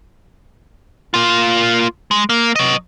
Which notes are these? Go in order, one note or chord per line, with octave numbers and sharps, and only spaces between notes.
A#3 F4
G#3
A#3
F#3 D#5